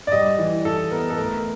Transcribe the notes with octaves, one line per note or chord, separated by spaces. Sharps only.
D5
G3 D#5
E3
E3 A4
B3 A#4
A4
A3 A#4